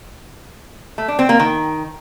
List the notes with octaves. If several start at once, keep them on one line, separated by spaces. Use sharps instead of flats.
A3
D4
C4
A#3
D#3